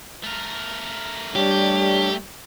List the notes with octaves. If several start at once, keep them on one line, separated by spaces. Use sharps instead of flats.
A3 A#4
G3 D4 G4 C#5